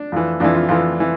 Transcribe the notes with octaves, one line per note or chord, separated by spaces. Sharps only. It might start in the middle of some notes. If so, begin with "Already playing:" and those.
Already playing: D4
F2 E3
F2 E3 D4
F4
F2 E3 F4
E3